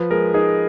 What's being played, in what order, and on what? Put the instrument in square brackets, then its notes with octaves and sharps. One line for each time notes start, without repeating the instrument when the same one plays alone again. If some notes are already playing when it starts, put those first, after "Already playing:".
Already playing: [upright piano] F3 [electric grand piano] B4
[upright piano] G#3 [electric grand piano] A#4
[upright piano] D#4 [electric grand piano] G#4